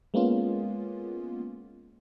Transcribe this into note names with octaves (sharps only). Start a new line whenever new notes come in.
G#3 A#3 B3 C#4 F4